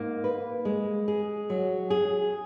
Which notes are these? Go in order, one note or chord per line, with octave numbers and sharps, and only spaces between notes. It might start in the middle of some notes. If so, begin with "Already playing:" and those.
Already playing: G#2 A#3
B4
G#3
G#4
F#3
G#4